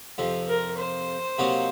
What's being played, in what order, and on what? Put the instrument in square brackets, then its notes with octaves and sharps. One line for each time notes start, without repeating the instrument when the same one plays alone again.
[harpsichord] F2 C3 F3
[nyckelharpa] A#4
C5
[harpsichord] C3 F#3 A#3 D#4 F#4